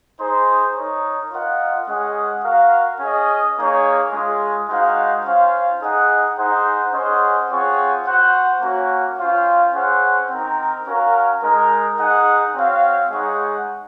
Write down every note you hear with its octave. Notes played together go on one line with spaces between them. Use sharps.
D#4 G#4 C5
D#4 A#4 C#5
F4 A#4 D#5 F#5
G#3 C#4 G#4 D#5 F#5
F#4 A#4 F5
C#4 G#4 D#5
A#3 D#4 G#4 C#5
G#3 C#4 F4 G#4
G#3 D#4 F#4 C5 F5
C#4 F4 C5 F5
D#4 G#4 D#5 F#5
D#4 G#4 C5 F#5
C#4 G#4 C5 D#5 F#5
C4 F4 G#4 C#5 F#5
F#4 C5 F#5
A#3 C#4 F#4 C#5
C#4 F4 C5 F5
C#4 G#4 C5 F#5
C4 D#4 A#4
C#4 F#4 A#4 F5
G#3 D#4 A#4
D#4 G#4 D#5 F#5
C4 F#4 C#5 F5
G#3 D#4 G#4 C#5 F#5